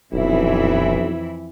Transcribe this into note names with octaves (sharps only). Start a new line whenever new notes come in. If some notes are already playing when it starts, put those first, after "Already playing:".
D#1 B1 F2 E3 E4